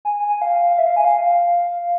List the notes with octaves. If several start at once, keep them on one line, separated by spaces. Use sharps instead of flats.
G#5
G#5
F5
F5
E5
F5
G#5
F5